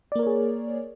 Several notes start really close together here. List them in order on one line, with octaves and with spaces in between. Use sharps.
D5 A#3 A#4 C#5 G#4